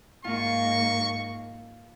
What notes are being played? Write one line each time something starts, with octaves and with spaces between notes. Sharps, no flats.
G#2 A#3 F4 C#6